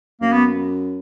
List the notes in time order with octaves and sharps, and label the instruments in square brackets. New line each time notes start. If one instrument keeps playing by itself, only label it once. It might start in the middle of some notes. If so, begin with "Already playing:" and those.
[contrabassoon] F#2 [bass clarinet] A#3
[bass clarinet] B3